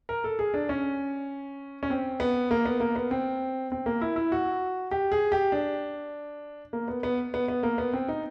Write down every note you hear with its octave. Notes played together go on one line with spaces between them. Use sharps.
A#4
A4
G#4
D4
C#4
C#4
C4
B3
A#3
B3
A#3
B3
C4
C4
A#3
E4
E4
F#4
G4
G#4
G4
D4
A#3
B3
B3
B3
B3
A#3
B3
C4
D#4